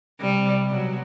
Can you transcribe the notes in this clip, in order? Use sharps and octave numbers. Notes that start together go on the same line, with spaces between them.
C3 G3
B2 F#3